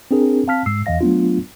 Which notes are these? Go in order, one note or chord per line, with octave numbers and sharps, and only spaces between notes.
C4 D4 G#4 A#4
C4 F5 A5 F6 B6
G#2 G#3 E6 C7
E2 E3 D#5 F5 A#6
F#3 A3 B3 D4 F4